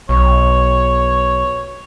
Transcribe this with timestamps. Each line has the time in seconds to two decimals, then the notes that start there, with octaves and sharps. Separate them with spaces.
0.09 B1 C#5